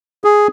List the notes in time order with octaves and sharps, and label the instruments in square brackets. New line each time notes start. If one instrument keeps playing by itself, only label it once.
[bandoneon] G#4